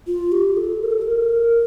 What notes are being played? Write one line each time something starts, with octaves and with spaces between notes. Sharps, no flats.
F4
G4
A4
A#4
A4
A#4